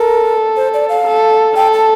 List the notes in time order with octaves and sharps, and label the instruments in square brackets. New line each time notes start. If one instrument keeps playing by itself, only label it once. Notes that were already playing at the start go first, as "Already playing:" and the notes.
Already playing: [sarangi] A4 [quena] A#4
[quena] C5
D5
F5
[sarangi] A4
[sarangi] A4 [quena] G5
[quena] A5